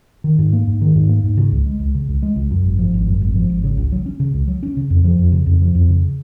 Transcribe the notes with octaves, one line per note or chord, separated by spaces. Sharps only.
D#3
G#2
A#3
G#2
D#3
G#2
A#3
G#2
C#3
C#2
G#3
C#2
C#3
C#2
G#3
C#2
F#2
G#1
F3
G#1
F#2
G#1
F3
G#1
C#3
C#2
F#3
C#4
C#3
C#2
F#3
C#4
C#3
F2
F3
F2
C#3
F2
F3
F2
C#3